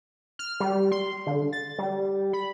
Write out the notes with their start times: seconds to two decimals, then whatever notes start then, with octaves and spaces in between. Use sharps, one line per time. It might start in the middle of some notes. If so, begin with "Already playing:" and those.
0.39 F6
0.60 G3
0.92 C6
1.27 D3
1.53 A6
1.78 G3
2.33 B5